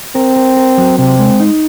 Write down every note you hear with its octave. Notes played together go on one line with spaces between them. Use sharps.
C4 A#4
A#4
A#4
F#3
C3 C4
G#3
D#4